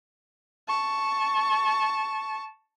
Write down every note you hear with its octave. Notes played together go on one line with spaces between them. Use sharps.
A5 C#6